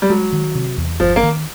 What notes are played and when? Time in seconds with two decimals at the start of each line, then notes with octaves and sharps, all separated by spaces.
0.02 G3
0.10 F#3 G#3
0.32 D#3
0.55 C3
0.77 E2
1.00 G1 F3
1.16 A#3
1.23 D#3